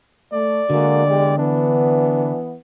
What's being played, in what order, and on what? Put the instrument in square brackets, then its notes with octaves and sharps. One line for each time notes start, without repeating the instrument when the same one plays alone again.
[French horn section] A3 [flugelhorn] D5
[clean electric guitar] D3 [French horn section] G#3 A#3 F#4
[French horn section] E2 G#3 G4
[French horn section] E3 B3 [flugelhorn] D4